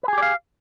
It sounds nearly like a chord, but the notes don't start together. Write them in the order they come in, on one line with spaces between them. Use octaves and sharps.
B4 G#4 G4 D5 F5